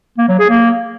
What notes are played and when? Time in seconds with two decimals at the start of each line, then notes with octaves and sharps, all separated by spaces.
0.18 A#3
0.28 F#3
0.39 G#4
0.50 A#3